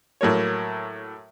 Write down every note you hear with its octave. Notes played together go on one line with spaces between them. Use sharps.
A2 F#3 A#3 C#5